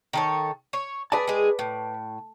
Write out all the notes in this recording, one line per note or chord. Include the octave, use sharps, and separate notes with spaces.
D#3 A4 C#5
C#5
G#4 B4 D5 A5
G#3 G#4
A2